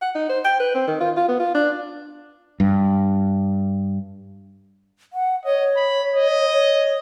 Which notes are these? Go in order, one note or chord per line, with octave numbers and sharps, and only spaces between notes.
F#5
D#4
C5
G5
B4
C4
D#3
F4
F4
B3
F4
D4
G2
F#5
C#5 D#5
B5
D#5
C#5